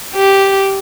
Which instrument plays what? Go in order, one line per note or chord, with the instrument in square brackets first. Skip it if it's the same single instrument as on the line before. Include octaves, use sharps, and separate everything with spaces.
[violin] G4